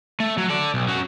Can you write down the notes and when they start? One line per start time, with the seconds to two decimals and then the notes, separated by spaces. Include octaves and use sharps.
0.20 A3
0.38 F#3
0.50 A4 D5
0.74 B1
0.88 C#4 F#4